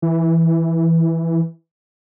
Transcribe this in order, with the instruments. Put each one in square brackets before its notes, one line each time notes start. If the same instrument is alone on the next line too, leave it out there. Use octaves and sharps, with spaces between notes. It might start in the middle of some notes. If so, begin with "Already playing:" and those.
[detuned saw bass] E3